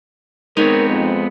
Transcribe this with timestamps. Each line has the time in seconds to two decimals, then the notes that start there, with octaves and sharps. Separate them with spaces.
0.57 G#3 B3 C4 D#4 A#4 C#5
0.89 F2